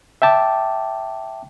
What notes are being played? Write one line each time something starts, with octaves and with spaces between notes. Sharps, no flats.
E5 G5 A5 D6